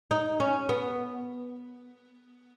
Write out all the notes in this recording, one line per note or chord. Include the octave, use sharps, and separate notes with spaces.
D#4
C#4
B3